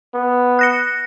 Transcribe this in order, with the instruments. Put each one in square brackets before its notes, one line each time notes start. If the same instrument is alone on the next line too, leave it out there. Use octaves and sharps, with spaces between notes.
[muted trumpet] B3
[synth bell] F#6 A#6 C#7